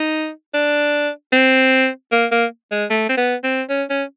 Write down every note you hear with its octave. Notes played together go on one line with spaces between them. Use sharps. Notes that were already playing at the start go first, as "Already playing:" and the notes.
Already playing: D#4
D4
C4
A#3
A#3
G#3
A3
C4
B3
C4
C#4
C#4